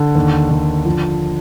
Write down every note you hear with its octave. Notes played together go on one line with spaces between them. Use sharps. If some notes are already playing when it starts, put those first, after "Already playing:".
Already playing: D3
D#2
D3
F3